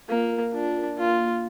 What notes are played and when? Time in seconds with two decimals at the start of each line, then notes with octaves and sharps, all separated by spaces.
0.08 A#3 F4
0.31 A#4
0.53 D4 F4
0.76 A#4
0.98 A#3 F4
1.19 A#3